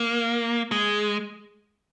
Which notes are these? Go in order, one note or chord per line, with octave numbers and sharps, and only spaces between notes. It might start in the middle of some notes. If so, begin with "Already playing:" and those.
Already playing: A#3
G#3